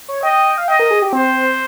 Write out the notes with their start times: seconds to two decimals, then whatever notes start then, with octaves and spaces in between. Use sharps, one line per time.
0.08 C#5
0.23 D#5 G5
0.58 F5
0.68 D#5 G5
0.79 A#4
0.91 G#4
1.02 G4
1.13 C4 C5